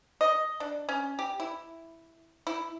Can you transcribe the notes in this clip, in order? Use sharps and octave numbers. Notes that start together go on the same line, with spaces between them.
D#5
D4
C#4
G4
E4
E4